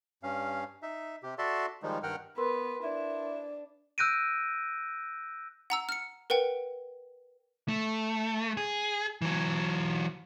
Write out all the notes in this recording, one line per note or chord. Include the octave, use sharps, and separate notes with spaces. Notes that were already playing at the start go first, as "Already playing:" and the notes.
G2 C#4 F5
D#4 E5
C3 G4
F#4 A4 D5 E5 A5 C6
D#3 F3 G3 G#3 D#4
G2 D#3 A#4 F#5 G5 F6
B3 A#4 B4 C6
D4 E4
E6 F#6 G6 A#6 D7 D#7
F#5 A#5 E6
F6 C#7
A#4 B4 F#5 G5
A3
G#4
E3 F#3